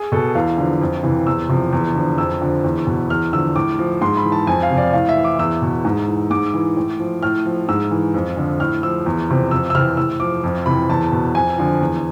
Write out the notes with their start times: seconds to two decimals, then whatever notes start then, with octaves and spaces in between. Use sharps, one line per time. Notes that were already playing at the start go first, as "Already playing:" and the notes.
Already playing: G#4
0.12 B2 A4
0.35 E2 F5
0.58 D3 F3
0.81 F2
1.03 C3 E3
1.27 E2 E6
1.49 C3 F3
1.73 E2
1.95 D3 F3
2.18 F2 E6
2.41 D3 F3
2.64 E2
2.87 B2
3.10 E2 F6
3.32 D3 F3 E6
3.56 A2 D6
3.79 F3
4.01 G#2 C6
4.17 B5
4.25 E3
4.32 A5
4.47 F2 G#5
4.63 F5
4.71 C3 F3
4.78 D5
4.93 A2 F5
5.09 E5
5.16 E3
5.24 D6
5.39 E2 E6
5.62 B2
5.85 G#2
6.08 E3
6.30 G#2 D6
6.54 E3
6.77 A2
6.99 F3
7.23 A2 F6
7.46 F3
7.69 G#2 E6
7.91 E3
8.14 F2
8.37 D3 F3
8.60 A2 F6
8.83 F3 E6
9.06 E2
9.29 C3 F3
9.51 F2 E6
9.70 E6
9.75 C3 E3 F6
9.97 A2 E6
10.20 F3 D6
10.43 F2
10.66 C3 E3 B5
10.90 E2 A5
11.12 B2
11.35 F2 G#5
11.58 D3 F3
11.81 E2